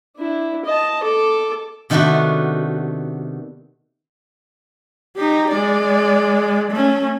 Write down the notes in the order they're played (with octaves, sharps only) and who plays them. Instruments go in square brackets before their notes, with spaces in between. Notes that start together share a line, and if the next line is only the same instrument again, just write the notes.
[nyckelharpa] D4 E4
D#5 A5
A4 D6
[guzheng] C3 D#3 A3 B3 D4 F#4
[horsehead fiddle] D#4 G4
G#3 D5
A3 C#4